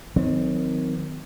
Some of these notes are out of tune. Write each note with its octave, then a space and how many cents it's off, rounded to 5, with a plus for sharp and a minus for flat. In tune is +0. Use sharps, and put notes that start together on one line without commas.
D#3 +0 F#3 -30 C4 -35